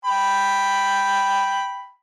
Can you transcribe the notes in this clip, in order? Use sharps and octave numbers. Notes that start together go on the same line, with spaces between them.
G5 B5